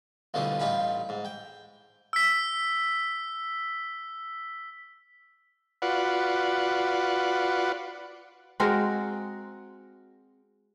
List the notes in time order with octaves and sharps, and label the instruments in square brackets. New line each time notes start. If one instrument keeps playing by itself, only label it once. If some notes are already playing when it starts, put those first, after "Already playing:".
[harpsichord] D2 B2 D3 E3 F3 G3
A1 G3 D#4 F4 G#5 B5
G#2
G5
[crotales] E6 B6
[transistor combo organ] F4 F#4 B4 D5 F#5
[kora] G#3 C4 F#4 A#4